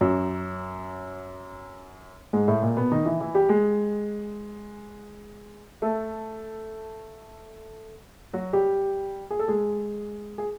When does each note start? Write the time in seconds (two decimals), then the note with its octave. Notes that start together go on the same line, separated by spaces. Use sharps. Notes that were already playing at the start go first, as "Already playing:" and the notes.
0.01 F#2 F#3
2.33 G#2 G#3
2.48 A2 A3
2.62 A#2 A#3
2.77 B2 B3
2.92 D#3 D#4
3.06 E3 E4
3.20 E3 E4
3.34 G3 G4
3.49 G#3 G#4
5.82 A3 A4
8.33 F#3 F#4
8.53 G3 G4
9.30 G#4
9.39 A4
9.48 G#3 G#4
10.38 G#4